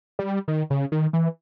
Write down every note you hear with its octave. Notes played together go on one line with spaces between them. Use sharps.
G3
D#3
C#3
D#3
E3